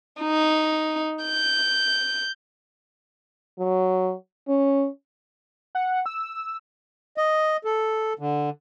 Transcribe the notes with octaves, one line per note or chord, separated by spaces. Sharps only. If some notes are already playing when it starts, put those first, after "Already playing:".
D#4
G6
F#3
C#4
F#5
E6
D#5
A4
D3